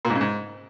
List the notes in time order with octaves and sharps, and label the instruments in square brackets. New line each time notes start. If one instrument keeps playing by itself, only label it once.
[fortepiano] A#2
G#2
C#3
G#2